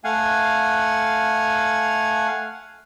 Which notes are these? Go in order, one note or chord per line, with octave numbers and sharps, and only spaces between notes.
A3 F5 F#5 G#5